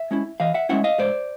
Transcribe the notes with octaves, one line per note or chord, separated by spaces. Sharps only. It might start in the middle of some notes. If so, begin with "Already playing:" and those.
Already playing: E5
G#3 C#4 E4
E3 D#5 F5
E5 F#5
G#3 C#4 E4 E5 F#5
D#5 F5
G#2 C5 D5